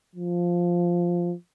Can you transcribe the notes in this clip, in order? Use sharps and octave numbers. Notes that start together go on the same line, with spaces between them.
F3